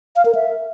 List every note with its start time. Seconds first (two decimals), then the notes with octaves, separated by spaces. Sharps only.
0.16 F5
0.25 A#4
0.35 E5